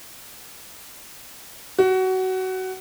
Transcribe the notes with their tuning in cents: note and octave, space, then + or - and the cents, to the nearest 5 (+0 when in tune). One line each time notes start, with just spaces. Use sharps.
F#4 +20